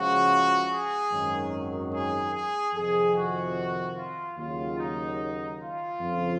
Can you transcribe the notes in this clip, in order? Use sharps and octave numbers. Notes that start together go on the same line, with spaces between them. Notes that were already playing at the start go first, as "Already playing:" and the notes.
Already playing: C#2 C#3 F3 F#4
G#4
G#1 F#2 D#3 F#3
G#4
G#4
F2 C3 D#3 G#4
F#4
F4
D#2 C#3 F#3 F4
D#4
F4
F2 C#3 F3